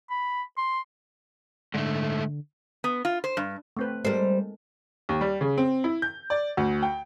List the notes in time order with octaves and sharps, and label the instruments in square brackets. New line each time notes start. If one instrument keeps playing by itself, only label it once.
[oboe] B5
C6
[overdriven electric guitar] G#2 A3 [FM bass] D3
[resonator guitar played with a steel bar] B3
F4
C5
G2
[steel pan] A3 C4 B4
[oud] G3 C5 [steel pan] G#3 A4 A#4
[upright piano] D#2
G3
C#3
C4
E4
G6
D5
D2
G5